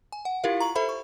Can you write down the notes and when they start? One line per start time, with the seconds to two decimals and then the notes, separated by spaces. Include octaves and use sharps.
0.12 G#5
0.25 F#5
0.44 E4 F4 G4 A#4 F5
0.60 A#5 C#6 F#7
0.75 A4 C5 E5 B5
0.89 C#6